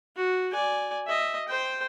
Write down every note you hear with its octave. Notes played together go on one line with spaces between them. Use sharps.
F#4
D5 G#5
D#5 E5
C5 G5